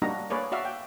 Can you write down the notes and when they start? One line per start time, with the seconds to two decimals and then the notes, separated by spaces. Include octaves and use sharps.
0.02 G3 A#3 D4 D#4 F#4 A#5
0.30 A#3 G#4 B4 C#5 D5
0.52 F#4 D5 E5 F5
0.65 G5